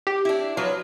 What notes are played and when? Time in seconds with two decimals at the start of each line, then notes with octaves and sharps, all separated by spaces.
0.07 G4
0.25 D4 E4
0.57 F3 F#3 B4